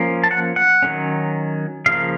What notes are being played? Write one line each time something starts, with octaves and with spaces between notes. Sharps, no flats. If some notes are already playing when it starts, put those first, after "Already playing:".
Already playing: F3 A#3 C#4
A5
F#5
F#5
D#3 F#3 A3 C#4
C#3 F3 A#3 F5